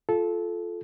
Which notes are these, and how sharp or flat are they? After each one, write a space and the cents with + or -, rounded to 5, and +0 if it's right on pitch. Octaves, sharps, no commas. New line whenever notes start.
F4 +0 A4 -20